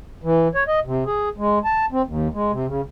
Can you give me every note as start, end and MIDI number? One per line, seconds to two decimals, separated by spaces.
0.24 0.48 52
0.55 0.64 73
0.68 0.80 75
0.85 1.04 48
1.06 1.29 68
1.38 1.59 56
1.65 1.86 81
1.92 2.02 60
2.07 2.28 39
2.34 2.52 56
2.52 2.66 48
2.67 2.81 49